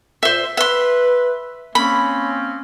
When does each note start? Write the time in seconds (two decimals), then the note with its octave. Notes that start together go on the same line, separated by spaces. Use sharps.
0.23 A#2 C5 E5 E6
0.57 B4 E5 C6
1.75 A#3 C4 C#4 B5